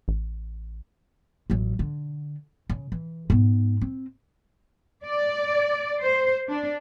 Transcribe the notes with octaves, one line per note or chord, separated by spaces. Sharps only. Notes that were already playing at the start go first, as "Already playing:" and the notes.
A1
A1 F#3
D3
C#3
E3
G#2 B3
C4
D5
C5
D4